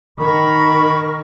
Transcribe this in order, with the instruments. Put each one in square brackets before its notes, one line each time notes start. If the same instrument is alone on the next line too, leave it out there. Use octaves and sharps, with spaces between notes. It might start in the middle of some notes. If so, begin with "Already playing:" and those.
[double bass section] D#3 [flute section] A#4 C#6 [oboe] B5